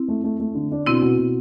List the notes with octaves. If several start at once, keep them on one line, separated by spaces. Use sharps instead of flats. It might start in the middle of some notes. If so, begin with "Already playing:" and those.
Already playing: C4 E4
A3
A3
A3
D3
D4
B2 C4 E4
B2
B2